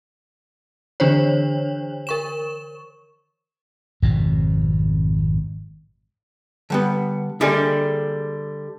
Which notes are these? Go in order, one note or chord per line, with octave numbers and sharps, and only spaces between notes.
D3 E3 D4 C5 C#5
A#4 C#6 E7
G#1 F2 B2
D3 G3 B3
D3 G3 A#3 G#4 E5